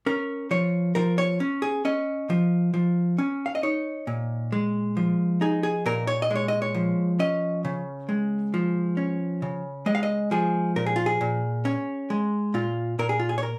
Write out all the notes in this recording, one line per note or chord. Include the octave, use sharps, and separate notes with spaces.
C#4 A#4
F3 C#5
F3 A#4
C#5
C#4
G#4
C#4 D#5
F3
F3
C#4
F5
D#5
D#4 C#5
A#2
G#3
F3
D#4 G#4
G#4
A#2 A#4
C#5
D#5
G#3 C#5
D#5
C#5
F3
C#4 D#5
C#3
G#3
F3
C#4
C#3
G#3 D#5
F5
D#5
F3 G#4
A#2 A#4
G#4
F4
G#4
A#2
C#4
G#3
A#2 F4
A#2 A#4
G#4
F4
G#4
C#5
A#4